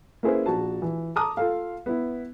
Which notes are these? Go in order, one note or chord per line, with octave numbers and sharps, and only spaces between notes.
A#3 C#4 E4 G#4 B4 C5
A#1 F#4 A5
E3
A5 A#5 D6 D#6
F4 A4 F5
B3 E4